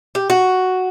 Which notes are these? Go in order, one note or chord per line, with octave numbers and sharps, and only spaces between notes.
G4
F#4